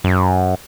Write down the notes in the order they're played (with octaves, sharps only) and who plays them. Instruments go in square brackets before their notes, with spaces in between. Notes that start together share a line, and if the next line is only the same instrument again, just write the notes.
[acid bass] F#2